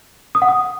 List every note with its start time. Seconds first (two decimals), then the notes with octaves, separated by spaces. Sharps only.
0.35 D#6
0.42 F#5
0.49 D#6